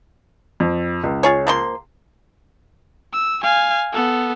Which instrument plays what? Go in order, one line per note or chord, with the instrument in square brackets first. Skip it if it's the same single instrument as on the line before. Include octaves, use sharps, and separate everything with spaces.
[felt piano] F2
C#2
[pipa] F4 G#4 C#5
F3 A#3 C6
[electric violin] E6
F5 G#5
B3 A4